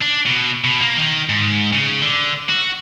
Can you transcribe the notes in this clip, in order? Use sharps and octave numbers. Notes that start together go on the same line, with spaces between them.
D4
B2
B2
A#3
D#3
G#2
C#3
D3
F#4